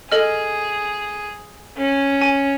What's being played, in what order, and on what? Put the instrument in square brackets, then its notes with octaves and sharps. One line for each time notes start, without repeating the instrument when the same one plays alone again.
[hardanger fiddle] G#4 [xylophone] A4 D#5 F6
[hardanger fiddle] C#4
[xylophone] G#5